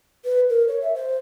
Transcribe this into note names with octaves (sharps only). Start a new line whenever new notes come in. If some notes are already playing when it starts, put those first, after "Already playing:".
B4
A#4
C#5
E5
C5